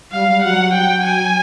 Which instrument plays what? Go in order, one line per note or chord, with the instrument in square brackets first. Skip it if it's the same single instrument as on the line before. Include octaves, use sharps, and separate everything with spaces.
[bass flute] G3 [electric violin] F5
[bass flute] G3
[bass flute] F#3 [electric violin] F#5
[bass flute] F#3 [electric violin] G5
[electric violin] G#5